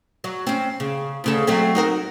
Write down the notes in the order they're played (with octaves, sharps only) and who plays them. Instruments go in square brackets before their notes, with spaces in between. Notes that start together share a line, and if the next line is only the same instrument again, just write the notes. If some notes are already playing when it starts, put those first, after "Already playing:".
[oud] F#3
C4 C#4
C#3
D2 C#3 A4
F#3 A3 C4
D#4 F#4 A#4